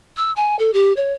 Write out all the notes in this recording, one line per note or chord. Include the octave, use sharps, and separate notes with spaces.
E6
G#5
A4
G4
C#5